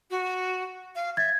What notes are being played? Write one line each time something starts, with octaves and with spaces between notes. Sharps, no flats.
F#4
F5
E5 G#6 A6